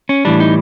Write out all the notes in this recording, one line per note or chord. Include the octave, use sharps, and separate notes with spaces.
C#4
A2 E3 G3 D4
D#4